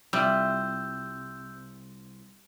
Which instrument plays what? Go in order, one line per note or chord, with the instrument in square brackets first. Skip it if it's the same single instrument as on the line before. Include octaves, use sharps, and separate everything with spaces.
[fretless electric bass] C2 [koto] G3 [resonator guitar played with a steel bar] F4 E5 [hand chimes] E6 G6